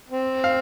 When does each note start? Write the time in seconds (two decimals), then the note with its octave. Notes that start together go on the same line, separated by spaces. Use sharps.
0.09 C4
0.44 F5